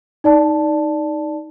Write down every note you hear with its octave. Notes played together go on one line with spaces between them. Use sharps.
D#4 D5 A5